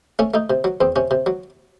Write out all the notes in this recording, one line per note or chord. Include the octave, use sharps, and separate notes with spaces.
A3 C#4
A3 D#4
C3
F#3
E2 C4
C3 C#4
C3
F#3